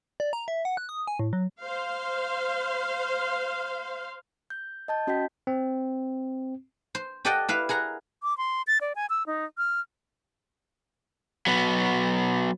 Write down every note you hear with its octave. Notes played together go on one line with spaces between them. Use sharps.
D5
A#5
E5
F#5
F#6
D#6
G#5
A2
F#3
C5 F5
G6
D#5 A5 G6
C#4 F#4 D#5 G5 G6 B6
C4
C5
G4 A4 D5 D#5 F#5 G5
E4 B4 F5
G#4 A#4 F#5 A#5
D6
C6
A6
D5
G#5
E6
D#4
F6
F#3 B3